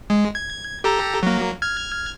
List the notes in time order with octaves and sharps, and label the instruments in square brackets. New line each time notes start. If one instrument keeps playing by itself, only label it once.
[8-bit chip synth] G#3
G#6
G4 A4 A#5
F#3 A#3
F6 G#6